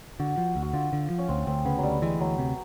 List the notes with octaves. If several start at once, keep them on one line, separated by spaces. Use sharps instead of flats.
D3 F#4
F3
D2
F#4
D3 F4
D3
F3
C#4
D2 C4
D2 C4
C#3 B3
F#3
D2 G3
E3 G#3
D2 F#3
C3